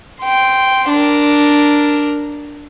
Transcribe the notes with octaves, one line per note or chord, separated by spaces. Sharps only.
G5 C6
D4 A#4